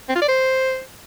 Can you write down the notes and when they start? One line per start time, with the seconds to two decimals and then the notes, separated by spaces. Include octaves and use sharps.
0.09 C4
0.15 F4
0.22 D5
0.28 C5